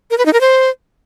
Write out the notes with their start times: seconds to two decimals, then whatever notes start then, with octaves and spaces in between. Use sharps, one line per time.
0.11 A#4
0.18 B4
0.26 D#4
0.33 A#4
0.41 C5